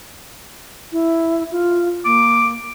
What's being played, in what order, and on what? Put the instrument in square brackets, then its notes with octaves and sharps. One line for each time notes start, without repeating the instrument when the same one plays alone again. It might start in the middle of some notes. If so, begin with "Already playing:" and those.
[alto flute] E4
F4
[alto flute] A#3 [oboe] D6